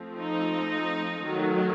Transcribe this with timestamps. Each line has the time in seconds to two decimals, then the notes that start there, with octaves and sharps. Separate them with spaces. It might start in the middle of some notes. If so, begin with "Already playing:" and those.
Already playing: F3 A3 C4
0.19 D#4
1.23 D#3 F#3 A3